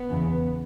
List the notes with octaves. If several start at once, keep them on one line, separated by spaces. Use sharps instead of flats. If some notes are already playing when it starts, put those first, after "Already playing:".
Already playing: B3
E2 C#3